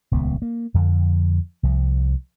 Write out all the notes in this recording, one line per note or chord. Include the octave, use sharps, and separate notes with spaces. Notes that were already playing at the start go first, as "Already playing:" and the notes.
D#1 C#2 B3
A#3
F2 D3
C2 F3